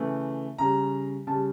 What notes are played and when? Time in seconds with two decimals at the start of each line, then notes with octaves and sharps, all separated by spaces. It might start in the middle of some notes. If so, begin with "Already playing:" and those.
Already playing: C#3 E3 A3
0.58 C#3 G3 A#5
1.27 C#3 G3 A5